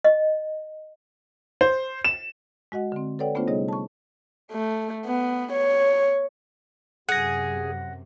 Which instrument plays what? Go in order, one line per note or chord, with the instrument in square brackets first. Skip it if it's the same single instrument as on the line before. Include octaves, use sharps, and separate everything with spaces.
[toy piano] D#5
[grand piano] C5
E7
[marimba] G#3 F#4 D#5 F#5
D3 C4
A4 B4 C#5 D5 F#5 G5
A3 B3 C#4 D4 F4 C5
C3 G3 D#4 G#4 C#5 D#5
A5 C#6
[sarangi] A3
B3
C#5
[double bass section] F#2 C3 [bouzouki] G#4 [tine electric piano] F#5 A#6